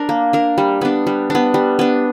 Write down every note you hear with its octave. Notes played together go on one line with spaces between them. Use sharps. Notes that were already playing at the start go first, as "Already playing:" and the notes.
Already playing: D4 A#4
A#3
D4 A#4
G3
B3 D4
G3
B3 D4
G3
B3 D4